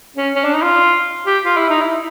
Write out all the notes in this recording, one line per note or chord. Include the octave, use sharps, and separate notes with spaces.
C#4
C#4
D4
D#4
F4
G4
F4
E4
D#4
E4